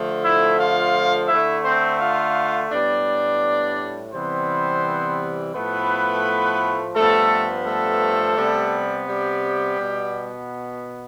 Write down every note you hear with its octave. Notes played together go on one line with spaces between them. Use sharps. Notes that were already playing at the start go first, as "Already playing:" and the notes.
Already playing: D3 F3 A3
E4 E5
F4 F5
D3 A3 E4 E5
C4 C5
F4 F5
A2 G3 B3 D4 D5
C3 E3 G3 B3 C4 C5
A2 F3 A3 B3 B4
G2 F3 A3 B3 A4
A3 A4
C3 G3 B3
G3 G4
B2 B3